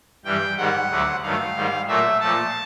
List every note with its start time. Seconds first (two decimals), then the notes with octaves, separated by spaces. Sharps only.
0.25 G2 E3 G3 G5
0.57 G#2 D#3 G3 F#5
0.90 D2 D3 F#3 A3
1.23 G2 D#3 F#3 A3 F5
1.55 G#2 D#3 G3
1.87 A#2 F#3 A3 E5
2.20 A#2 F3 A3 A5